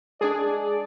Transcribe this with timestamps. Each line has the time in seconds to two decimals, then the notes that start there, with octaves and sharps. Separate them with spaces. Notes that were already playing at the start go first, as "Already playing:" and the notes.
0.21 G#3 D4 G#4 D5